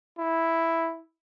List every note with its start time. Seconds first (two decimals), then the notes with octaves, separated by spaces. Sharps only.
0.18 E4